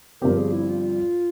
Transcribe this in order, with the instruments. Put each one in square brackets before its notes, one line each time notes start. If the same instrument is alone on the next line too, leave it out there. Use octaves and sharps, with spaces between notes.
[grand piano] G1 G2 F3 C4 G4 [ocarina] A#4
[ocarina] G#4
E4
F4